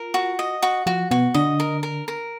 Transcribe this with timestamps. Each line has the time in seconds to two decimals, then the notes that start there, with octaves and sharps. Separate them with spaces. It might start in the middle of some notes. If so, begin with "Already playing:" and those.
Already playing: F4 A#4
0.14 F#4
0.39 D#5
0.62 F#4
0.86 F3 F4 F#4
1.11 B2 B3 F#4
1.34 D3 D4 D#5
1.60 A#4
1.83 A#4
2.08 A#4